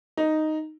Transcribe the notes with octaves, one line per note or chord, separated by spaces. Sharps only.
D#4